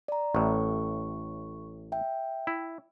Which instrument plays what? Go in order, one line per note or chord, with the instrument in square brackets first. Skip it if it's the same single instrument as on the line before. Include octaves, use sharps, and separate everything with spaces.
[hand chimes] D5 A#5
[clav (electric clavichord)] A1 A2 [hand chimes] C#6
[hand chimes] E5 G5
[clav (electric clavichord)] E4